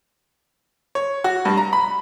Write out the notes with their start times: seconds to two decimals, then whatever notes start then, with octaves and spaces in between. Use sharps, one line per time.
0.95 C#5
1.24 F#4
1.45 G2
1.57 A#5
1.73 B5